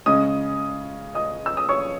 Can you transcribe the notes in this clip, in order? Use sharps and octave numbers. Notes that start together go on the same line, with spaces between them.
C#3 G#3 C#4 D#5 D#6
D#5 D#6
E6
D#6
C#5 C#6